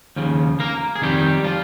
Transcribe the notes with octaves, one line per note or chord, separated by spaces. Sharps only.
D#2 C#3 F3
A#3 A#4
G#4
F2 D#3 G3 G4
F3 F4